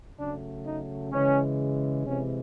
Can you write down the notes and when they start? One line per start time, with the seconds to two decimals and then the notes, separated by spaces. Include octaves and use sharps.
0.19 C#3 F#3 A3 D4
0.66 D#4
1.12 C#3 E3 G#3 C#4
2.05 C3 E3 G#3 C#4